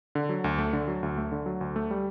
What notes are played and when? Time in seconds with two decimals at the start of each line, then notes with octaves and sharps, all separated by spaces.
0.15 D3
0.29 F#3
0.44 D2
0.58 A3
0.73 D3
0.88 F#3
1.03 D2
1.18 A3
1.32 D3
1.46 F#3
1.61 D2
1.76 A3
1.91 G3